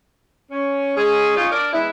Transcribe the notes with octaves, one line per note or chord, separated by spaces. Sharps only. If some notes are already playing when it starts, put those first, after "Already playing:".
C#4
G#3 C#4 G#4
C#4 D#4 F4
D4 A#4 D5
G#3 B3 E4